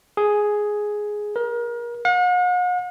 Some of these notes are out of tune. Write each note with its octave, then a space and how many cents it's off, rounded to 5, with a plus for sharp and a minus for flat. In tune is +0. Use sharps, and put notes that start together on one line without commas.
G#4 +5
A#4 +30
F#5 -45